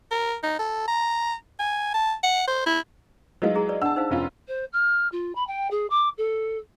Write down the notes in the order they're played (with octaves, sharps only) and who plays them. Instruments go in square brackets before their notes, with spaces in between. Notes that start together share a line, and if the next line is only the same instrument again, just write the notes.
[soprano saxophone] A#4
D#4
A4
A#5
G#5
A5
F#5
C5
E4
[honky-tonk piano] F#3 G#3 D#4 [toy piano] B4 D#5 F5
[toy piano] E4 G#4 A#5
B4 D5
[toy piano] D4 F#5 [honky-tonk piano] A5 E6
[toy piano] D#4 C5 F5
[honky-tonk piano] F1 C#4 F4
[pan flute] C5
F6
F4
B5
G5
G#4
D6
A4